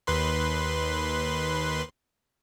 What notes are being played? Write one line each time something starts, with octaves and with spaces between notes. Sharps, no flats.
D#2 B4 C6